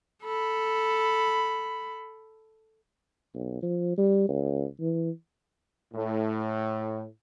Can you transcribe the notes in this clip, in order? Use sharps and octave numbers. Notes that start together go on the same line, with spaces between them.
A4 B5
B1
F3
G3
C#2
E3
A2